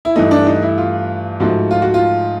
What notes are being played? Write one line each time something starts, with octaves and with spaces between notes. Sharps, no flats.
E4
G2 E3 A3 D#4
D4
D#4
E4
F4
G#2 F3 A3 F#4
F4
F#4
F4